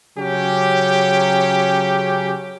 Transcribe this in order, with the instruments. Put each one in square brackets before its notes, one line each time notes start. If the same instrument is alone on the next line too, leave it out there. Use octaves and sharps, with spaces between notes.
[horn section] C#3 F#3 C#4 G4